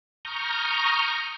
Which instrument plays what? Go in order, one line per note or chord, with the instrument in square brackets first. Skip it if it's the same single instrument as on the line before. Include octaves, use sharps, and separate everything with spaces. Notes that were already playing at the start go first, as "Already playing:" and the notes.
[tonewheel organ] A#5 C#6 D#6 F6 G6